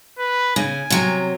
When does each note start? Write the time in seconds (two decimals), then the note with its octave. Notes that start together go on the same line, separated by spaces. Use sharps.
0.19 B4
0.56 C#3 G#5
0.90 C3 F#3